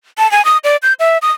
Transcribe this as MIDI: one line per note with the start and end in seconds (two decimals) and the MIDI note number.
0.18 0.30 81
0.31 0.44 80
0.45 0.57 87
0.64 0.77 74
0.83 0.93 91
1.00 1.18 76
1.22 1.32 87